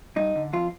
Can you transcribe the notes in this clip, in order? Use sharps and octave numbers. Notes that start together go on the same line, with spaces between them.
G2 D#4
D3
F2 F4